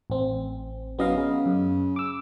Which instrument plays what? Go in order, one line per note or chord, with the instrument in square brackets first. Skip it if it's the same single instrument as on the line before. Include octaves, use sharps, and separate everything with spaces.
[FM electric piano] A1 C4
[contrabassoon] F#2 [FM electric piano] B3 D#5 F5
[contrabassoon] C#3
[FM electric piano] F#2
D6 E6